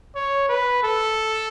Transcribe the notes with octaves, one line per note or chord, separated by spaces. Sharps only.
C#5
B4
A4